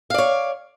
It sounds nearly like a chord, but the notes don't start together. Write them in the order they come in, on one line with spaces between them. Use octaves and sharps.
F5 D5 C#5